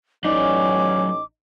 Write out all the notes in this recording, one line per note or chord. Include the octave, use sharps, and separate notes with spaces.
A1 F#3 C#4 D#4 D5 D6